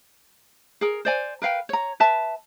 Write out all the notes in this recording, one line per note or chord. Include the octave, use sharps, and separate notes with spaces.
G#4 A#4
C5 D5 G#5
A#4 B4 F5 G5
C#5 A#5
B4 E5 A5